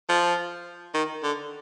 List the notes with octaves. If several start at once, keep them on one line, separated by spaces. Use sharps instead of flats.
F3
D#3
D3